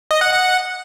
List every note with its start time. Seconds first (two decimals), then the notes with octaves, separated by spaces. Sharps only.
0.11 D#5
0.21 F#5
0.32 F#5